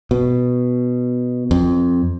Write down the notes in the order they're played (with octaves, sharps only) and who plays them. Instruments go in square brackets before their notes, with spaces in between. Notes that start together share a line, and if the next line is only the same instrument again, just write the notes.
[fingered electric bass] B2
F2